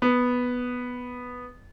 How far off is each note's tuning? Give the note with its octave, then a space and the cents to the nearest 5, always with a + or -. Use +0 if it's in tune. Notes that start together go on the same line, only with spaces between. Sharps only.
B3 +0